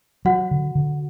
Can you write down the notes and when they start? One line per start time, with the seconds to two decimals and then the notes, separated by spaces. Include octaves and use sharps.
0.25 F#3 F#4 F#5
0.51 D3
0.75 D3